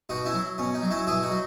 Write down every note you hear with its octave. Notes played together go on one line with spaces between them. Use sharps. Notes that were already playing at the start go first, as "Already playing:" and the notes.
B2 D#4 F#4
C#4 E4
F#3
B2 C#4
D#4
F#3
C#4 E4
B2 E4 G#4
D#4 F#4
F#3